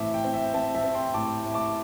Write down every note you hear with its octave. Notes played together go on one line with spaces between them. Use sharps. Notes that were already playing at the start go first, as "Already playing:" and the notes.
Already playing: A2 E3 C4 E5 A5 D6
G5
C4
E5
C4 E5 A5
E5 A5
C4
G5 C6
A2 A5 D6
A2
A5 D6